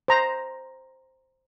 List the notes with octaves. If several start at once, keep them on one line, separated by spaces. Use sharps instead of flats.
C5 A#5